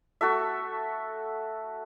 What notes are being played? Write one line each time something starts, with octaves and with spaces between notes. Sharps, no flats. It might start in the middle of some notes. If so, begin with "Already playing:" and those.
A3 F#4 A4 E5